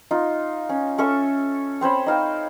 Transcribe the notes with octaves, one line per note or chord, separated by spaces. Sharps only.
D#4 F4
C#4
C#4 A4 E5 C#6
C4 C5 C#5 B5
D#4 F5 G5